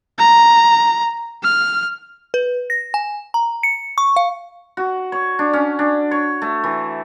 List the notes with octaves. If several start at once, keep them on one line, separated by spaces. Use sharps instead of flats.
A#5
F6
B4
A#6
G#5
A#5
C#7
C#6
F5
F#4
C#5
D4
C#4
D4
C#5
A3
E3